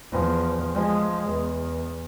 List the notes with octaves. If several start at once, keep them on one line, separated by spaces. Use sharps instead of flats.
E2 F3
F3 G#3
E2